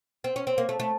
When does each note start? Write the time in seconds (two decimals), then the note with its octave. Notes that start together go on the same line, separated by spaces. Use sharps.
0.24 C4
0.36 C#4
0.47 C4
0.58 A#3
0.69 A3
0.80 A3